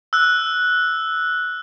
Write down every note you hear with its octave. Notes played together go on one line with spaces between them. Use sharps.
E6 F#6